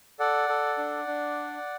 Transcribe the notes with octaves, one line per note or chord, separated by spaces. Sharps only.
A4 D5 F#5
A4
D4
D4